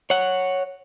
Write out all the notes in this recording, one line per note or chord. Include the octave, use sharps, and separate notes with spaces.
C#5 F#5